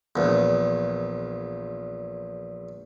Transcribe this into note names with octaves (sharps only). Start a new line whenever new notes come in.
A#1 E2